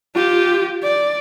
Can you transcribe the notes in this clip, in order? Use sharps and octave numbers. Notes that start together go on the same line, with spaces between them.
F4 G4
D5